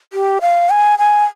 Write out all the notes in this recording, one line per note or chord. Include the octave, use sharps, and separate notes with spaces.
G4
F5
G#5
G#5